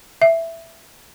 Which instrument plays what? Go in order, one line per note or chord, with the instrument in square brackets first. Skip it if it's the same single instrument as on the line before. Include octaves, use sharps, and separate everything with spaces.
[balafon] E5